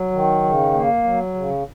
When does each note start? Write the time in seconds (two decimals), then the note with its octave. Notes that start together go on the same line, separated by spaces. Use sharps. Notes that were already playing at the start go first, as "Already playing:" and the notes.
Already playing: F#3
0.12 D#3
0.43 C#3
0.73 A#3
1.04 F#3
1.34 C#3